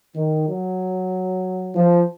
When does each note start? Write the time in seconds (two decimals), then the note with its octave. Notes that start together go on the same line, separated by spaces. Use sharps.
0.16 D#3
0.49 F#3
1.75 F3